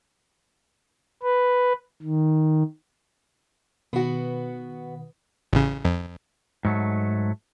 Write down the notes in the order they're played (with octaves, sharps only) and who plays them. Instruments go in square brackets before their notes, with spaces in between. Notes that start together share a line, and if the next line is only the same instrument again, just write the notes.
[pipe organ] B4
D#3
[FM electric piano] B2 D#3 B4 [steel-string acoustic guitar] B3 F#4
[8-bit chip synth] A1 C#3
F2
[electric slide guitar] G#2 F#3 A3